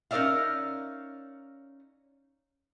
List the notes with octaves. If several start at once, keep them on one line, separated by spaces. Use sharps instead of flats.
C#4 D#4 A#4 D5 E5 F5